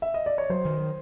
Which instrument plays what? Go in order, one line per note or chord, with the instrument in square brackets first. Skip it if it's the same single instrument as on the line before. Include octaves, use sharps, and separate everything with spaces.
[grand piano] E5
D#5
D5
C#5
[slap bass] F#3 [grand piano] C5
[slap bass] D#3